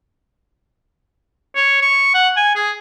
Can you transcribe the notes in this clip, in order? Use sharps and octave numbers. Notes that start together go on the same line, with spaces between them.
C#5
C#6
F#5
G#5
G#4